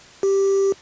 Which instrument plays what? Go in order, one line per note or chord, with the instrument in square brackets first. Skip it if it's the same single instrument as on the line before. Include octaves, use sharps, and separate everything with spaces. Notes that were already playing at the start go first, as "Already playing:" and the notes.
[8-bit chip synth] G4